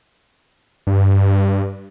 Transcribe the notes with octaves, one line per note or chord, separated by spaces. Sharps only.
G2